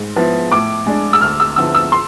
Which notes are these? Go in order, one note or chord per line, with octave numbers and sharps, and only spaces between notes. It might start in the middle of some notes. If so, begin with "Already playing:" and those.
Already playing: G#2
F3 B3 E4
A2 D6
G#3 D4
E6
D2 F6
E6
D3 F3 B3 E4 E6
E6
C6